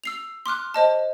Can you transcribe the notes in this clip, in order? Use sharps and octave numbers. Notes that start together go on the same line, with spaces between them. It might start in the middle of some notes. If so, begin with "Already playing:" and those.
E6 C7 F7
C6 D6 F6 F#6
C5 D#5 A5